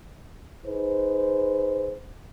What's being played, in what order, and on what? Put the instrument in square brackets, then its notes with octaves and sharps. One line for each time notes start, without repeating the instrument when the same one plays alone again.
[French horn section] D#4 G#4 B4 C5